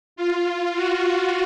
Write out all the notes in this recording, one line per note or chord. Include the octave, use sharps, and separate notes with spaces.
F4
F#4